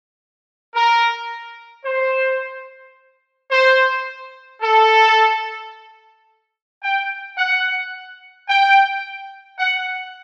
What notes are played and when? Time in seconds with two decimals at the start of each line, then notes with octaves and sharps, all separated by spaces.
0.75 A#4
1.85 C5
3.51 C5
4.62 A4
6.84 G5
7.38 F#5
8.49 G5
9.59 F#5